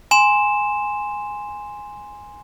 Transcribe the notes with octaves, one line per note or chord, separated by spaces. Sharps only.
G#5 C6 E7